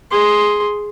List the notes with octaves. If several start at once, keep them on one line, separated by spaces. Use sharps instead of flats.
G#4 C6